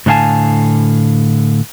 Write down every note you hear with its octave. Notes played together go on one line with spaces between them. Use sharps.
A2 D3 D4 F5 G#5 A5